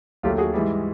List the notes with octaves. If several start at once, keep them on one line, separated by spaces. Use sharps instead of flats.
D#2 D3 F#3 A3 F4 G4
F#4 G#4
G#2 E3 G3